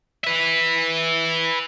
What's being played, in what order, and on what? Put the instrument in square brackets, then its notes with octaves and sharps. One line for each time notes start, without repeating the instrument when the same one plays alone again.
[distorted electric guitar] B4 E5